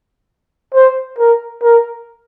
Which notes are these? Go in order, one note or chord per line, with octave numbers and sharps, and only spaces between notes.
C5
A#4
A#4